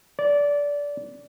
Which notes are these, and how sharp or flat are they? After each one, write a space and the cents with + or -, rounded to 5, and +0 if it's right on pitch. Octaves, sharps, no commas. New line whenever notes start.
D5 -20